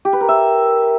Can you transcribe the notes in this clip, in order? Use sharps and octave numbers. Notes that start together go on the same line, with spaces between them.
G4
B4
A#4
E5